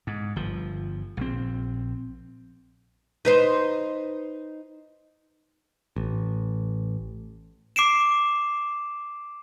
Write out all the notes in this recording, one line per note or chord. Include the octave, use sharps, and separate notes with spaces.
G#2
G1 F3
A#1 C4
D#4 B4 C5
A1
D6 C7 D7 E7